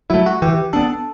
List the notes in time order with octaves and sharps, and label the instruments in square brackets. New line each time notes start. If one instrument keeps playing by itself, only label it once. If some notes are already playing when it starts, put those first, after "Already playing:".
[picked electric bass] F#3 A3 [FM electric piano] E4
[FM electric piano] F#4
[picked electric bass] E3 [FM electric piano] G4
[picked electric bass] B3 D4 [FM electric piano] A4